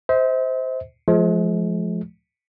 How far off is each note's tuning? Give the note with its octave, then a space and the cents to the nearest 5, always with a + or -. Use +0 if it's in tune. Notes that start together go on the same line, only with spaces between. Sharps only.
C5 -10 E5 -45
F3 -5 G#3 +45